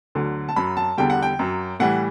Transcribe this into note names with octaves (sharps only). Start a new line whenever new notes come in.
D2 D3 F#3
A5
F#2 F#3 B5
A5
E2 D3 G3 G5
F#5
G5
F#2 F#3
A2 E3 G3 F#5